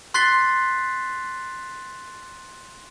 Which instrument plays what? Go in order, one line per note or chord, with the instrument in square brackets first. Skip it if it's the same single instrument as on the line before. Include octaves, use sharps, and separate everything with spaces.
[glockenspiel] C6 F#6 A6 B6 C7 G7